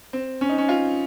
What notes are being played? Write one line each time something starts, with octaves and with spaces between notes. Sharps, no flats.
C4
C#4
D#4
C#4
F4